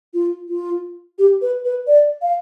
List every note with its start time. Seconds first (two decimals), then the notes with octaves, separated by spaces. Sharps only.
0.14 F4
0.49 F4
1.18 G4
1.41 B4
1.65 B4
1.87 D5
2.22 F5